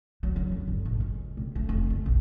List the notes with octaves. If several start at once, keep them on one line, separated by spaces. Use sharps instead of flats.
F#3
F#3
F2
G1
A1
C#2
C3
A3
F1
C#3
B1